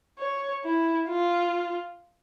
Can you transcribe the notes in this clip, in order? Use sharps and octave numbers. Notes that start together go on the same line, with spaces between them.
C#5
E4
F4